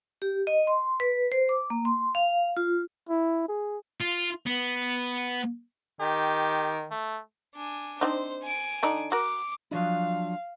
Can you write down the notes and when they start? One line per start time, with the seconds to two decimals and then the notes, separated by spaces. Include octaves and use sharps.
0.22 G4
0.47 D#5
0.67 C6
1.00 B4
1.32 C5
1.49 D6
1.70 A#3
1.85 C6
2.15 F5
2.57 F4
3.09 E4
3.49 G#4
4.01 F4
4.46 B3
6.00 D#3 G4
6.91 A3
7.55 D4 G#5
8.01 C4 D4 D#4 C5
8.43 G#5 D7
8.83 D3 D4 D#4
9.12 F#4 A#4 D6
9.71 F3 F#3 D4 F5